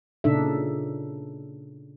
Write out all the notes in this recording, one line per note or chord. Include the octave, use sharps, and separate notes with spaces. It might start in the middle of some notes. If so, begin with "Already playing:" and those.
A#2 C#3 D4 D#4 A4 E5